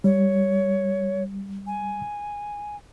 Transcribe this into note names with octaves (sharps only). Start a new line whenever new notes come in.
G3 C#5
G#5